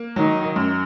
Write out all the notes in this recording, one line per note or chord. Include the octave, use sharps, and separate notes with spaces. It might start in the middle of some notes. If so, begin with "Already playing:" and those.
Already playing: A#3
D#3 F#3 D#4
F#2